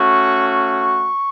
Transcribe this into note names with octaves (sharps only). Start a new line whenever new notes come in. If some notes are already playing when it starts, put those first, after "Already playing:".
Already playing: A3 C#4 F#4 C#6
C#6